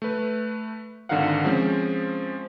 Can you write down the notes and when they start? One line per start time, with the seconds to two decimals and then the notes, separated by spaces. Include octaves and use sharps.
0.02 A3 B4
1.09 G#1 D3 D#3 A#4 F5 F#5
1.45 F3 G#3 C4 C#4 C5